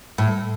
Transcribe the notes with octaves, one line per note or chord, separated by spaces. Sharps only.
A2